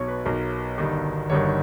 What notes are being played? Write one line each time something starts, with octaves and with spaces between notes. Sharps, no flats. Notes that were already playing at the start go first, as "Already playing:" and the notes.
Already playing: B1 B2 C#5
B4
B1 B2 A#4
G1 G2 D#3
G1 G2 D#3 C#5